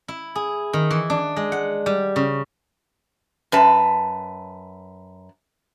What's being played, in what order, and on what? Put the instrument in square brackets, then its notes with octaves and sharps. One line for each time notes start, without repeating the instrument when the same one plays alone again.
[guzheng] E4
G#4
D#3
E3
D4
G#3
F#5
G3
C#3
[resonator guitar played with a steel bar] F#2 B4 A5